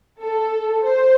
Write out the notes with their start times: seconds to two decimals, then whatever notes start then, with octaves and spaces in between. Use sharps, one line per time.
0.21 A4
0.83 C5